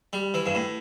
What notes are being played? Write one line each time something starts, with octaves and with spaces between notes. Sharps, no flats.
G3
E3
G2
A2